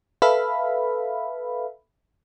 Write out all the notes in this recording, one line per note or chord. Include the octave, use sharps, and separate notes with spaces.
A4 B4 E5 F5 B5